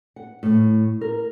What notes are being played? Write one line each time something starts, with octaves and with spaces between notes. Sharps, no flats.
F#5
A2
A#4